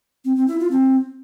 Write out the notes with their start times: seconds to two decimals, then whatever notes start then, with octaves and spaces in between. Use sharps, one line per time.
0.25 C4
0.36 C4
0.48 E4
0.59 F4
0.71 C4